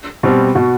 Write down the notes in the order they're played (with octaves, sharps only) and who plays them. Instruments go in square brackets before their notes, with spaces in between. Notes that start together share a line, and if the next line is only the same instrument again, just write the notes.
[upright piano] B2 G3 C4
[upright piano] B2 [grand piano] F#4